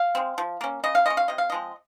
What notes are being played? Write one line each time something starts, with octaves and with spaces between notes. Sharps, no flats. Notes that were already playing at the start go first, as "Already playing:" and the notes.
Already playing: F5
G#3 C4
F3
A#3 C#4
C#3 D#5
F5
G#3 C#4 D#5
F5
C3 D#5
F5
F3 G#3 C4 D#5